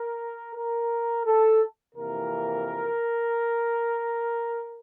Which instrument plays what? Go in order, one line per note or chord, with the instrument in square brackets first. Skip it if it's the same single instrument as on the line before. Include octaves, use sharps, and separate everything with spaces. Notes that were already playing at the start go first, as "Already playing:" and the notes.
Already playing: [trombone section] A#4
A#4
A4
F2 C3 E3 A#3 A#4